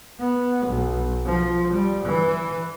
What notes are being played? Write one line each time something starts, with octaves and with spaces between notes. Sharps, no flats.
B3
B1
F3
G3
E3